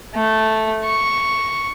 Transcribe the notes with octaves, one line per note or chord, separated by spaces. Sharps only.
A3
C#6